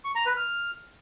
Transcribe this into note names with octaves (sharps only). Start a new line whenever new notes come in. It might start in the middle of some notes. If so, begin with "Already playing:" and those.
C#6
A#5
B4
F6